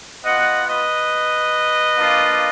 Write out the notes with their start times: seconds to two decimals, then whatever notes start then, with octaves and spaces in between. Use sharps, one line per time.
0.24 B3 F4 D#5 F#5
0.68 B4 D#5
1.97 A#3 D4 F4